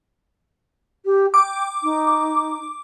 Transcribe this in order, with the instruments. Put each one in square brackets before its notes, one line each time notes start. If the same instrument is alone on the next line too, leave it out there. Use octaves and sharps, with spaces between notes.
[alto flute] G4
[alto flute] G5 [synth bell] D6
[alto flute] D#4